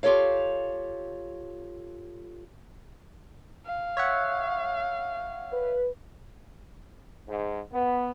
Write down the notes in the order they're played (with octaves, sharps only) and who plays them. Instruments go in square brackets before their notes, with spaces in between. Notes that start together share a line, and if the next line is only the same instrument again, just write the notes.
[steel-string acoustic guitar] F4 G4 A4 C#5 F5
[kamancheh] F5
[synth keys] C#5 E5 F#5
[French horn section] B4
[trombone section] G#2
B3